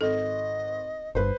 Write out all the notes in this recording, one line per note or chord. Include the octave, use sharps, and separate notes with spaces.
G#1 A4 D#5
G1 G2 B4 C5